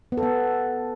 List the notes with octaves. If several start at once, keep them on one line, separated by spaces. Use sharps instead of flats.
B3
A4
B3